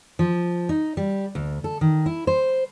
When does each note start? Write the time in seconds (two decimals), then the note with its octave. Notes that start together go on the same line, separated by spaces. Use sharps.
0.19 F3
0.69 D#4
0.97 G3
1.35 D2
1.64 A4
1.81 D#3
2.06 E4
2.27 C5